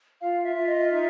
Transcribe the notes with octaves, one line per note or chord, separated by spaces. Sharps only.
F4 F5
E5
F4
D#5
D#4 E5